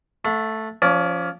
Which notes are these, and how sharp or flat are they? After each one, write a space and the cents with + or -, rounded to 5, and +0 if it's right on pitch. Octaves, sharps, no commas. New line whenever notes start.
A3 +0 F#5 -40 B5 +35
F3 +0 C#4 +20 D5 -20